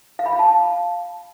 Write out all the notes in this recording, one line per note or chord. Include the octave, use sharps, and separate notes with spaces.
F5
B5
F5
A5